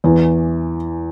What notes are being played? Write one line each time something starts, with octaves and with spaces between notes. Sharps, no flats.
E2 E3